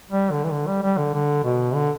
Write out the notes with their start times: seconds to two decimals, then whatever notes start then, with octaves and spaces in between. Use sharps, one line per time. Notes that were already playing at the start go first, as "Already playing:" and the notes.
0.11 G3
0.31 D3
0.44 E3
0.52 D3
0.67 G3
0.83 G3
0.97 D3
1.14 D3
1.44 B2
1.74 D3